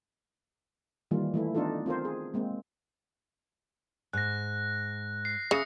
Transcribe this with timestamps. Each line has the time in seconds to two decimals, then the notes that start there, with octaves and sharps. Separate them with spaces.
1.11 D#3 E3 G3 A#3 F4
1.34 E3 A3 E4
1.55 B3 D4 D#4 F4 A4
1.86 C4 F4 A#4 C5
2.05 G#4
2.34 G#3 A#3 C4
4.13 G#2 F#6 A#6
5.25 C7
5.51 C#3 E5 D#6 A#6 C#7